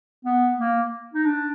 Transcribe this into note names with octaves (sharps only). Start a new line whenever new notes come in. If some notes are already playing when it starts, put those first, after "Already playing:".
B3
A#3
D#4
D4